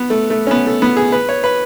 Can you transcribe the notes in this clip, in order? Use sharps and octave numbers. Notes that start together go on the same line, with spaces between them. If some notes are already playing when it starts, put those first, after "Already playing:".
Already playing: B3
A3
A3
C#4
B3
A3
B3
G#4
B4
C#5
B4